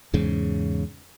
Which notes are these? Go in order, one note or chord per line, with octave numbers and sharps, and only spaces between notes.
E2 G#2 C#3